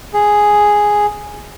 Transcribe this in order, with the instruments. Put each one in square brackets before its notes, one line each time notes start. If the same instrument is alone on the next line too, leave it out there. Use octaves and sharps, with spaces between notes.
[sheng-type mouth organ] G#4